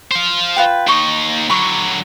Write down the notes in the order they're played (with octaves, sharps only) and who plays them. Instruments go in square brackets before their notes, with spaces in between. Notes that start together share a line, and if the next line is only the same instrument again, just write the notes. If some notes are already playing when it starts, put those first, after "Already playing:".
[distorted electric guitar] C5 F5
[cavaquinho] F4 B4 G5
[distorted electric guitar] D#2 D#4 [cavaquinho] C6 C#6
[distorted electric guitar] D3 F#3 [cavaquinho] B5 C#6